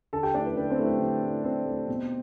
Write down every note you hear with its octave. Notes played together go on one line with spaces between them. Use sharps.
D3 A4 A5
G4 G5
A3 D4 E4 D5
B4
D3 B4
C4 C5
A3 E4
B4
D3
A3 E4
D3 C4 C5
A3 E4
B2